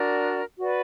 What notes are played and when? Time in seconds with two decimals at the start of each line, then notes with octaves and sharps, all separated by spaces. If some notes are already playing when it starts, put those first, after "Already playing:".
Already playing: D4 F#4 A#4 D5
0.59 F#4 B4 D5